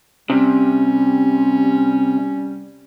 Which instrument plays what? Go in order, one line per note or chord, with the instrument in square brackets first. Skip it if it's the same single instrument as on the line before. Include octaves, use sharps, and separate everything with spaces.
[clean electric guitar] C3 [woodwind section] G3 C#4